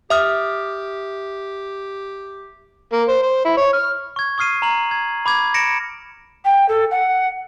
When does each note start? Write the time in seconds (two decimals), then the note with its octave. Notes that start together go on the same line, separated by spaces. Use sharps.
0.10 G4 E5 D#6 F6
2.93 A#3
3.09 C5
3.23 C5
3.45 E4
3.57 C#5
3.74 F6
4.16 C#6 G#6
4.38 C#6 D#6 F6 C7 D#7
4.62 A#5 F#7
4.91 G#6
5.26 B5 D6 G#6
5.54 A#6 C#7 D7 E7
6.44 G5
6.68 A4
6.90 F#5